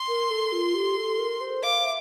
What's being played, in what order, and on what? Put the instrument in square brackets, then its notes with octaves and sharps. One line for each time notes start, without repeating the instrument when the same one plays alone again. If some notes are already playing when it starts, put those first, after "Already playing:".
Already playing: [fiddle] C6
[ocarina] A#4
A4
F4
G4
A4
A#4
C5
[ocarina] F5 [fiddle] D6
[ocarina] E5